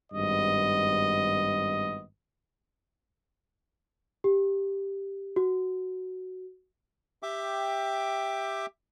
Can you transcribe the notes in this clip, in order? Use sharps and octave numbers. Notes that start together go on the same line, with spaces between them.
G#1 G2 B3 D#5
G4
F#4
G4 E5 G5 D6